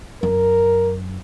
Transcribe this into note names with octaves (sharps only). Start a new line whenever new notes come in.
F#2 A#4